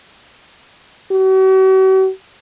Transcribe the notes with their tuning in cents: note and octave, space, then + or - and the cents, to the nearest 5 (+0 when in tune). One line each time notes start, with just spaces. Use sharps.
F#4 +45